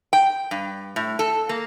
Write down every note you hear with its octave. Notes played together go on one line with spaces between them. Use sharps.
G5
G2
A2
A4
A#3